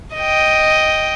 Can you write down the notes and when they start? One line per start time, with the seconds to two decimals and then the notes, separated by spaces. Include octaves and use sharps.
0.16 D#5 G5